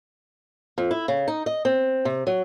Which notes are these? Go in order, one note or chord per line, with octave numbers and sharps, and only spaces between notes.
F2
E4
C#3
D#4
D#5
C4
C3
F#3